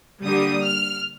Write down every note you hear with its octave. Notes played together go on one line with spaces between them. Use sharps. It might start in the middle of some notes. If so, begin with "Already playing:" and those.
D3 G3 A#3 D#6
F6